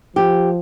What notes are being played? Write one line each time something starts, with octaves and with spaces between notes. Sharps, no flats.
F3 G4